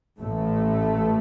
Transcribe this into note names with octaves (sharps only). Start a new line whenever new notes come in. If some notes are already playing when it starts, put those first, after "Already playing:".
A1 A2 A3